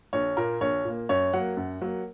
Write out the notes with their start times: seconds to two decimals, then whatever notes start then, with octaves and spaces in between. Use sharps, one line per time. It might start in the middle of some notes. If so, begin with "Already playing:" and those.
0.13 A#1 C#5
0.37 A#2 A#3 A#4
0.61 A#1 C#5
0.85 A#2 A#3
1.09 F#2 C#5
1.33 F#3 A#3 F#5
1.57 F#2
1.82 F#3 A#3